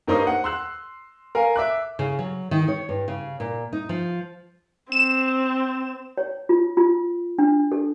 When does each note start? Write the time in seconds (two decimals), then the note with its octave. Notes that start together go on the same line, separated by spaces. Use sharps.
0.07 G2 A#3 D#4 C5 C#5 D#6
0.27 F#5
0.44 C6 E6 F#6
1.35 A#4 F5 G#5
1.56 E5 D6 F#6
1.99 C#3
2.19 F#3
2.51 D#3
2.68 C#5
2.89 G2
3.08 C#3
3.40 A#2
3.73 D#4
3.89 F3
4.92 C4 E7
6.18 C#5
6.49 F4
6.77 F4
7.39 D4
7.72 A4